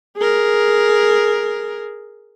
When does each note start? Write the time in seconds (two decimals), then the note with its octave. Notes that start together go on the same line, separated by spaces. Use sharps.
0.17 G#4 A#4